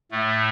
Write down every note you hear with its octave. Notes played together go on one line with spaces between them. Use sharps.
A2 A3